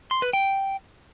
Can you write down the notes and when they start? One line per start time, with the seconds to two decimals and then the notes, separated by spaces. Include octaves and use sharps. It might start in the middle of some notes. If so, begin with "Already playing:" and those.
0.11 C6
0.22 B4
0.33 G5